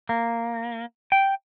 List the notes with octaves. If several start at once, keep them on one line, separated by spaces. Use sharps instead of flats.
A#3
G5